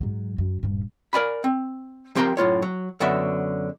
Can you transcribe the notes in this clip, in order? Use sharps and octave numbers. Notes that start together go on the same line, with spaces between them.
G#2 F#3
F#2
D#1 G2
A#4 D5 G#5 B5
C4
F3 C4 G4 A#4 A#5 C6
F#2 A2 F4 C#5
F#3
F#2 D3 B3 F#4 E5